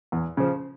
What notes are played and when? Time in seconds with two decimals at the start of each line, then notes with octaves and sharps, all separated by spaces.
0.12 E2
0.37 C#3 F3